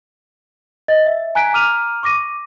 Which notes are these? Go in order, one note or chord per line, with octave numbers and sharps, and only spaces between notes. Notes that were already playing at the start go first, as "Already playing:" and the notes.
D#5 A6
E5
G#5 A#5 F#6 G#6 B6 D7
A#5 D6 F6 D#7 F7
C#6 D6 A#6 D#7